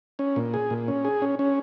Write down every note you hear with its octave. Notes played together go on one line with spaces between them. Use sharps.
C#4
A#2
G#4
A#2
C#4
G#4
C#4
C#4